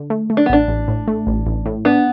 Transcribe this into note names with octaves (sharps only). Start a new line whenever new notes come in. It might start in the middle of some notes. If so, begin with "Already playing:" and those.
Already playing: D3
A3
A3
D4
B3
A1 D4
A1
A2
A3
A1
A1
A2
B3 D4